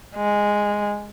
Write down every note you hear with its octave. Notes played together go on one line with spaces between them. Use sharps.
G#3